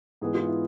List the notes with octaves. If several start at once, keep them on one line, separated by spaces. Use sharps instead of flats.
G#2 E3 B3 G#4
F4
E4